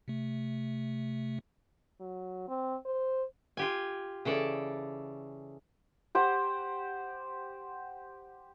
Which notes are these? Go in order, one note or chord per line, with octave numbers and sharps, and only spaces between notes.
C3 A3
F#3
C4
C5
F4 G4 G#5
C#3 E3 A4 D5 A5
G4 C5 F#5